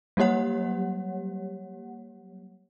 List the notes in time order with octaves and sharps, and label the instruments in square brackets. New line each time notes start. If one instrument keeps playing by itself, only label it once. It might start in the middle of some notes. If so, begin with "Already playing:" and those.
[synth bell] F#3 G3 A#3 G4 C#5 F#5